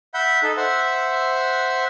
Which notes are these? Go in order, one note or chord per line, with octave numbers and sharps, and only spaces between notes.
E5 F#5 B5 G6
D#4 A4
C5 E5 F#5